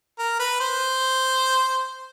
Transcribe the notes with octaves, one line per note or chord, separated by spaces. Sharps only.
A#4
B4
C5